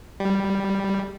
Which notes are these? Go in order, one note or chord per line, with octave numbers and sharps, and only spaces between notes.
G3